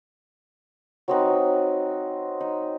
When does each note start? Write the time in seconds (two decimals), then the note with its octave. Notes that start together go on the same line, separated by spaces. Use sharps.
1.08 F#3 C4 D#4 B4
2.40 D#4